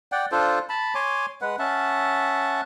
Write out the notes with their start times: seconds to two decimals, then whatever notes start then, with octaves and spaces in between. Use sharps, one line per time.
0.12 D5 F#5 G5
0.32 D4 F4 A4 C5
0.69 A5 B5
0.95 C#5 G#5 C6 D6
1.41 G#3 B4 F#5
1.59 C#4 E5 F#5 A5